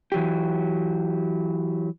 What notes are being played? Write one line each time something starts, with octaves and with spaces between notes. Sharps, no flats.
E3 F#3 G4